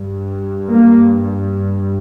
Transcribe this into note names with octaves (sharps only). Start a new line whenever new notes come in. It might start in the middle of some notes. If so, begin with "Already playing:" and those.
Already playing: G2
A#3